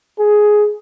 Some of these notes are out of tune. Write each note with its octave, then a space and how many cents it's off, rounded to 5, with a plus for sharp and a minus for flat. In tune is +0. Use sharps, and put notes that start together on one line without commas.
G#4 +10